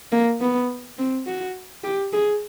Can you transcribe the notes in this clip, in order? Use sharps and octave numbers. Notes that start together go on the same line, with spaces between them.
A#3
B3
C4
F#4
G4
G#4